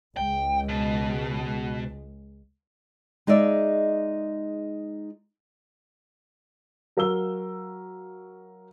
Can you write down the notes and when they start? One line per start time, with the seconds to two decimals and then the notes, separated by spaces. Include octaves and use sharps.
0.17 C#2 G#3 G5
0.69 B2
3.27 G#3 D#4 G#4 D5 E5
6.97 F#3 A#4 F5 E6 G7